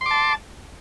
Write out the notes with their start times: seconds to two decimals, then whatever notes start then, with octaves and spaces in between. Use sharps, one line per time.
0.01 C6
0.06 D6
0.11 A5